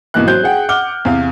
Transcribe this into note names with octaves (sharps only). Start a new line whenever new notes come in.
G#1 B2 E3 A#3 D#5 F#6
F#3 F#4 C5 G6
G#4 F#5 G5
F#5 D6 F6 G7
E2 C3 F5